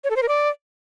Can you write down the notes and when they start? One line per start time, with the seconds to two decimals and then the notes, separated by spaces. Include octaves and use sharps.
0.04 C#5
0.10 A4
0.16 C5
0.22 A#4
0.29 D5